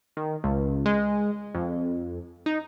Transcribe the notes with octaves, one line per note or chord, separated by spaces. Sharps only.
D#3
C#2
G#3
F2
D#4